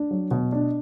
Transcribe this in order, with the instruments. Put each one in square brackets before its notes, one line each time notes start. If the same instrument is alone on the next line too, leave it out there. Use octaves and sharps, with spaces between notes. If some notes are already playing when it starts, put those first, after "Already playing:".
Already playing: [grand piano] D4
F#3
B2
D4